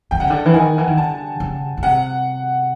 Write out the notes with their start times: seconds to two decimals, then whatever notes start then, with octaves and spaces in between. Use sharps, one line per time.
0.11 D3 G5
0.20 C#3 F#5
0.28 D3 G5
0.46 E3
0.54 D#3 G#5
0.78 E3
0.88 D#3
0.97 D3 A5
1.40 C#3
1.77 C#3
1.83 C3 F#5